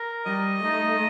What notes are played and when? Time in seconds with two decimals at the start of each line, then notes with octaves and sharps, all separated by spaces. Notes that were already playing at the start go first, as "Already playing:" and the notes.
Already playing: A#4
0.25 G3 D#5
0.63 A3 D#4